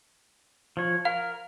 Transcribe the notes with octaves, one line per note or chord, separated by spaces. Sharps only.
F3 C#5
A#4 F5